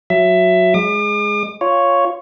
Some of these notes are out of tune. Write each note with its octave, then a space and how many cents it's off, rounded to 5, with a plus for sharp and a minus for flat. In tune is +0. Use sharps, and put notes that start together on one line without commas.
F#3 -10 E5 +15
G#3 +0 D6 +45
F4 +0 C#5 +0